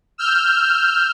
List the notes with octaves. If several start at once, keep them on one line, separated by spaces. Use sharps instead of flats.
E6 F6 G6